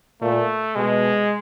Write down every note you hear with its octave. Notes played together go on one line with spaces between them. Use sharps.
A#2 A3
B2 G#3